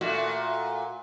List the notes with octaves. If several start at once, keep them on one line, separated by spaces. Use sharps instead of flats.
A#2 A3 F#4